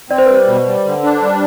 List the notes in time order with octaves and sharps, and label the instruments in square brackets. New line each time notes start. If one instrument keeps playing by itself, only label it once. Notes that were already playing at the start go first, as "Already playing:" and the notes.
[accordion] C4 [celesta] D5
[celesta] C5
[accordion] G3 [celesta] B4
[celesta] C5
[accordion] B2
G3
D3
D4
G3